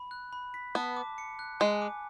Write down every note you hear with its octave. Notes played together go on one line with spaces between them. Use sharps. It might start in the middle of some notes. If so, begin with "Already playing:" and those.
Already playing: B5
F#6
B5
B6
B3 A5
D6
C#7
F#6
G#3 G#5
D6